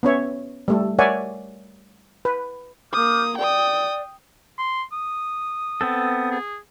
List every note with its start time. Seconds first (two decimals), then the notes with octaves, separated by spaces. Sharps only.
0.03 B3 C#4 C#5 E5
0.68 G3 A3 A4
0.99 A#4 C#5 D5 E5 F#5 G#5
2.25 B4
2.93 A#3 D6 D#6 F6 G6
3.38 D5 G5 D#6
4.58 C6
4.92 D#6
5.81 B3 C4 A4
6.31 G#4